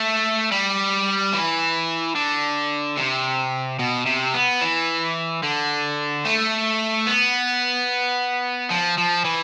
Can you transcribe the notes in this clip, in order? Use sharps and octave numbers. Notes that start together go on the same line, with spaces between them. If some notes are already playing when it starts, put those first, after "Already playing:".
Already playing: A3
G3
E3
D3
C3
B2
C3
B3
E3
D3
A3
B3
F3
F3
E3